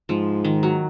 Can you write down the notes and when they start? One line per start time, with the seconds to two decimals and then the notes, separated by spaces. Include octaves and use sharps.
0.09 G#2 F3
0.45 D#3
0.63 F#3